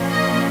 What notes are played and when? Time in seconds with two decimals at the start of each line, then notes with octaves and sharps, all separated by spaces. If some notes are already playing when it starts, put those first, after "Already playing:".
Already playing: A#2 F3 A#3 C#4
0.12 D#5